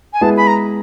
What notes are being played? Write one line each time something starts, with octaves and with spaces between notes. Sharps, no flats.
G#5
G#3 B3 E4 G#4 A5
B5
A#5